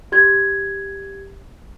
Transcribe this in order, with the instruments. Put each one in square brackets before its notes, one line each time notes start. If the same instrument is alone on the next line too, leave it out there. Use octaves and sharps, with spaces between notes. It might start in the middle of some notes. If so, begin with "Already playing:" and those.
[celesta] G4 G#6